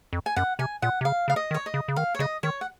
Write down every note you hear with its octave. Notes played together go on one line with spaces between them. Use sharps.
F2
G#5
F#2 F#5
C3 G#5
A#2 F#5
C3
C#3 F5
C#3 F5
D#5
D#3
C#5
D#5
C#3
C#3
D#3 F5
C#5
C#3 D#5
D#3 C#5
F#5